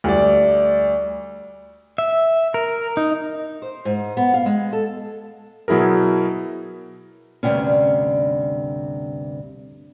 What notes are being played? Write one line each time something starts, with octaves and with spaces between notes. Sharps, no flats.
D2 G3 D5
E5
A#4
D#4
C5
G#2
B3
F5
G#3
A4
B2 F#3 E4 G#4 A#4
D2 G2 C3 C#4